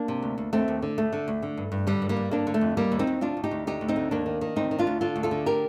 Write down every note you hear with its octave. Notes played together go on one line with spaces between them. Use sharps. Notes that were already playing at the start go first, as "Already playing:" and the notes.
Already playing: A#3 D4
C3
D2
D2
D#2 A3 C4
D#2
D3
D2 A3
D3
D2
D3
G2
G2
D3 G3
G2
G3 A#3
G2
D3 A#3 D4
D3
A3
F2
D#2 G3 A#3
D#2
C4 D#4
D#2
D2 D4 F4
D2
D#4 G4
D2
D3 D#4 G4
D2
C4 D#4
D3
D#2 A#3 D4
D#3
D#3
D2 C4 D#4
D#3
D4 F4
D2
D3 F4 A4
D2
F4 A4
D3
G4 A#4